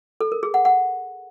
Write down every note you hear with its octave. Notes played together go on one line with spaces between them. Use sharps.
A4
A#4
G#4
F#5
F#5